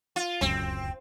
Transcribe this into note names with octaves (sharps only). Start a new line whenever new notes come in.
F4
D1 C#2 F#2 C4